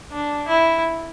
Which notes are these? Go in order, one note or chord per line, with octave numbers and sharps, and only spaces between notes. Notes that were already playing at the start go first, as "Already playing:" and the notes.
D4
E4